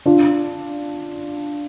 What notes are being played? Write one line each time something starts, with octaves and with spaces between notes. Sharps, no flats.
D4 F4